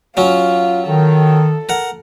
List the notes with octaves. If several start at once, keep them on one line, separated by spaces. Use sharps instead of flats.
F#3 C#4 F4
D#3 A4
A#4 F#5